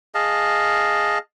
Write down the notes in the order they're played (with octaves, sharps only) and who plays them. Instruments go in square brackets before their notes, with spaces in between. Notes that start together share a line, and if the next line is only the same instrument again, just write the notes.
[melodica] G#4 D#5 F5 A5